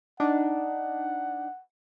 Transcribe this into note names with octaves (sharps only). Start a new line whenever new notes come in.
D4 D#4 F#5